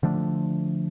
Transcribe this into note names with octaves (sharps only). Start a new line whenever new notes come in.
D3 F3 A3 D4